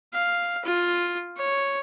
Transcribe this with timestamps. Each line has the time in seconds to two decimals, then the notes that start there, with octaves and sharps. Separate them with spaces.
0.14 F5
0.65 F4
1.37 C#5